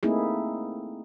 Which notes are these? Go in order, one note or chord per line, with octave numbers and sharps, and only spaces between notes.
A3 A#3 C4 D#4 E4 G#4